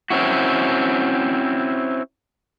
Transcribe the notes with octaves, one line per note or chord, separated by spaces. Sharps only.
C4 C#4 E4 F#4